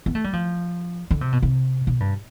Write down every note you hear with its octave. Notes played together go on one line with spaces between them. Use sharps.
B3
A3
G3
F3
D3
C3
B2
C3
B2
G2